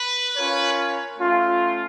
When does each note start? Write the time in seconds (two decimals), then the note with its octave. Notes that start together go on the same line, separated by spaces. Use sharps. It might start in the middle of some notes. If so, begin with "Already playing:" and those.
Already playing: B4
0.36 C#4 F4 A#4 C#5
1.18 A3 C#4 F4